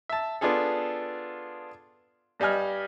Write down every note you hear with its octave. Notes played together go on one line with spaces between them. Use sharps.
E5 A5
B3 D4 F4 G#4 A4
G2 G3 D#5 G#5 F6